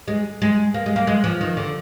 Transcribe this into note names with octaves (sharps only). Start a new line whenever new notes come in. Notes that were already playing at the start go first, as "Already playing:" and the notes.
G#3
G#3
A#3
G#3
A#3
G#3
F3
D#3
D3